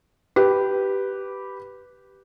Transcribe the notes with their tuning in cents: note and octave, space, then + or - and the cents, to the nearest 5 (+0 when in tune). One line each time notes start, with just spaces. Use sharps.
G4 -10 B4 +0